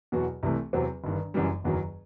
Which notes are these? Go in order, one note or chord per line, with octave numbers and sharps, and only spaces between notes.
E2 B2 F#3 B3 F#4
C2 C3 E3 A3
E2 C3 F#3 C4
G1 G2 D#3
F#1 F#2 E3 G3
F#1 E2 D#3 F#3